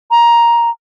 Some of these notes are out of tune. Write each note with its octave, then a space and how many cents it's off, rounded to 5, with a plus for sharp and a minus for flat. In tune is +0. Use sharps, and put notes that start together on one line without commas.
A#5 +10